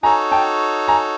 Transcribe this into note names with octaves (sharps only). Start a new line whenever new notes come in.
D#4 F#4 A4 C#5 G#5 A#5
G5 A5
G#5 A#5